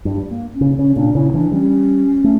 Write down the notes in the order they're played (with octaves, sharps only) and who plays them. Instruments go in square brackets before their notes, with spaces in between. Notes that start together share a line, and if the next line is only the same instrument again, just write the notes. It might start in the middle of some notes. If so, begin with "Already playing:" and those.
[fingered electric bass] G2 [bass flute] G3
[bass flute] A#3
C#4
[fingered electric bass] C#3
[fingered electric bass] C#3 [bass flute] C#4
[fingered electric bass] A#2 [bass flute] D4
[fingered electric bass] C#3 [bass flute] E4
[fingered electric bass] E3 [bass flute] D4
[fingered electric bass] G3 [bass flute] C#4
[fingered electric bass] A3